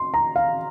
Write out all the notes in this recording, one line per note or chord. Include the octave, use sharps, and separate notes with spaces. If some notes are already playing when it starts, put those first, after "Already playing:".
Already playing: C6
A#5
F5